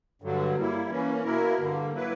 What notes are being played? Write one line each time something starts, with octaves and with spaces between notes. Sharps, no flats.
G2 D3 F#3
G3 A#3 E4
E3 A#3 C#4
B2 A#3 E4 A#4
G2 D3 A#3
F#3 A#3 E4 B4